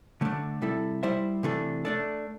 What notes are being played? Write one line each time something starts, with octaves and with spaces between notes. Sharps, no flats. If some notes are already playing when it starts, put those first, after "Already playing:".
D3 A3 D4
C3 G3 E4 A4
G3 E4 C5 E5
C3 E3 A3 D4 A4
A3 D4 A4 D5